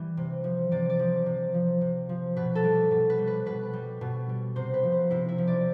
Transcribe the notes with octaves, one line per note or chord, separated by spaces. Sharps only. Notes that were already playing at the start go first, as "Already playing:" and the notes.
Already playing: E3 G3
C3
F3
C3 D5
D5
F3
C3
F3
C3
F3
B2 B4
A4
G3
B2 A4
B4
G3
B4
B2 B4
G3
B2
G3
C3 C5
B4
F3
C5
C3 E4
E4
F3
D5